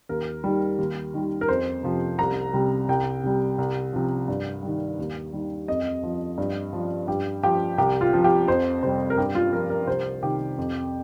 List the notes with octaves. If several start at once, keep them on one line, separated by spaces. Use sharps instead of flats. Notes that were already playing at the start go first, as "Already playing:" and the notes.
D#2 A#4
D#3 G3
D#2
D#3 G3
A#4
F2 C5
C3 F3
C2 A#5
C3 G3
C2 G5
C3 G3
C2
C3 F3
G2
D#3 G3
D#2
D#3 G3
F2 D#5
F3
G2
F3
G2 G4
F3 G4
C2 G4
F4
C3 F3
G4
F2 C5
C3 G3 C5
A#4
G2 G4
F4
F3 A#4
A#4
C2 C5
C3 D#3 G4
F2